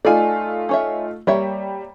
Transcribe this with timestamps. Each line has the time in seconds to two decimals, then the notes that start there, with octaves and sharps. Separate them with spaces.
0.05 A3 D#4 F4 D5 G#5
0.69 C#4 C#5 E5
1.27 G3 A#3 C#5 E5